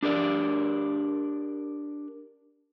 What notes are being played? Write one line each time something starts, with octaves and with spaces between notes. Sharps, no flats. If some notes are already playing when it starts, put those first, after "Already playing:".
D4 G4 A#4 D5